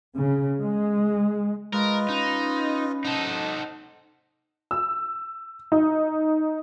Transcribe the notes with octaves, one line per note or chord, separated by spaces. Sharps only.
C#3
G#3
G#3 F4 A#4 B4 D#5
C#4 D#4
D#4 A4 C5 D#5 F#5
E6
D#4